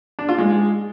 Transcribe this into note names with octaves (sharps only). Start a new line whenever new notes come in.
D4
F4
G#3